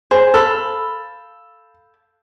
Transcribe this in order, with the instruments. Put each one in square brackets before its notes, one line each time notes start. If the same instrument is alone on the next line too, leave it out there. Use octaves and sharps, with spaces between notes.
[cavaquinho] G#4 [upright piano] C5
[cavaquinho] A4 F5 B5 [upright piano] E6